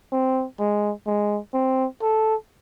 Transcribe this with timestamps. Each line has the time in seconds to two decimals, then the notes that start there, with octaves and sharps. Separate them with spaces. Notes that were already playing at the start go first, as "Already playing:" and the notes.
0.12 C4
0.60 G#3
1.07 G#3
1.54 C4
2.02 A4